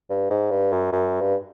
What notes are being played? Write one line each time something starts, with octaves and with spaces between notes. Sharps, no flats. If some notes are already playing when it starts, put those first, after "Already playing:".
G2
G#2
G2
F#2
F#2
G2